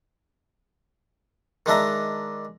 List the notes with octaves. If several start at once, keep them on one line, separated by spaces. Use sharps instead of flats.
D#3 G#3 D4 E5 A#5